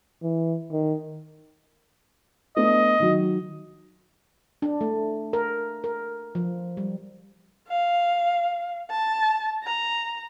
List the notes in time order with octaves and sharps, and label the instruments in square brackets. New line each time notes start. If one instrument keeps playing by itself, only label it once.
[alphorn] E3
D#3
[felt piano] A3 B3 D4 [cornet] D#5
[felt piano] D#3 F#3
[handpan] D4
A3
A#4
A#4
F3
G3
[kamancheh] F5
A5
A#5